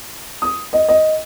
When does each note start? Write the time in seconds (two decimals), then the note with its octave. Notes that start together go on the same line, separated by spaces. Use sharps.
0.42 D#6
0.73 D#5
0.88 D#5